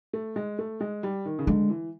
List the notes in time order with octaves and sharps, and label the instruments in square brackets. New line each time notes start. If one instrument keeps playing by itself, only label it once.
[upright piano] A3
G#3
A3
G#3
G3
D#3
C#3
[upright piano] D3 [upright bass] G#3
[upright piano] E3